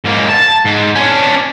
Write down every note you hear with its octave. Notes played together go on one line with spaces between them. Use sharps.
G#2 A#3
A5
G#2
C#4 D4